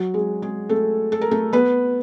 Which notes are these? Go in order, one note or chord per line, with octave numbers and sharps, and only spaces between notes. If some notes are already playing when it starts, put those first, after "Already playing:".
Already playing: F#3 F#4
G#3 G#4
G#3 G#4
A3 A4
A4
A#4
A3 A4
B3 B4